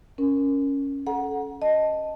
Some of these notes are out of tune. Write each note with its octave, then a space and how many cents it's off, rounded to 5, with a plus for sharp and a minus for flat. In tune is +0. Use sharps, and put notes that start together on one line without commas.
C#4 +0 A#4 +0
A4 -25 F#5 +0 A#5 +30
D#5 +0 A5 +0